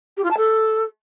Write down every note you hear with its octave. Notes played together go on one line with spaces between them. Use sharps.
G4
F4
A5
A4